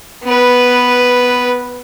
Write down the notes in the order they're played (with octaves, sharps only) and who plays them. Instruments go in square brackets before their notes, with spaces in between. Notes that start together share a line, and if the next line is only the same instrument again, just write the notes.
[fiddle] B3 B4